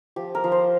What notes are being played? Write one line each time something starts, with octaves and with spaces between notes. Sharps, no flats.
F3 G4
A#4
F3
C5